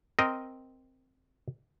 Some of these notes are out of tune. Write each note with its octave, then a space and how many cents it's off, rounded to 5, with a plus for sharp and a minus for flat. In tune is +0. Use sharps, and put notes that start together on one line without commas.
C4 +0 A#4 +0 D#5 +0